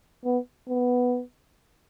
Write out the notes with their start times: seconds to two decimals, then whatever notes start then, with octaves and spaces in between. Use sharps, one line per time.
0.25 B3
0.69 B3